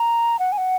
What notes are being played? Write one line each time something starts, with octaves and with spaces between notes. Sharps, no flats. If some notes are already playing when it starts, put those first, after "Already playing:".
Already playing: A#5
F#5
G#5
F#5